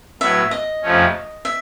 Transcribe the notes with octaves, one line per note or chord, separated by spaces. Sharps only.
A2 F#3 B3 E5
D#5
F2 C3 F3 A3 C#4
E5